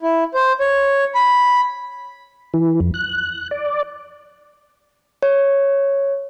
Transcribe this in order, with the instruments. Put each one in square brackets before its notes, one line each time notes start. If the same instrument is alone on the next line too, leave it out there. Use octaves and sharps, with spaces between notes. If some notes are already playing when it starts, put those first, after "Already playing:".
[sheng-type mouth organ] E4
C5
C#5
B5
[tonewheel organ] E3
F2
F#6
D5
[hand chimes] C#5